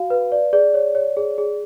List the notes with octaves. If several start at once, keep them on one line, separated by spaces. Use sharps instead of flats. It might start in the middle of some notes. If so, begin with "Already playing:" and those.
Already playing: F#4 F5
B4
D5
G#4 D5
C#5
C#5
G#4
G#4